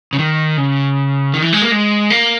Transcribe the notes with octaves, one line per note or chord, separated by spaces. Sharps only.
C#3
D#3
C#3
D#3
E3
G#3
A#3
G#3
A#3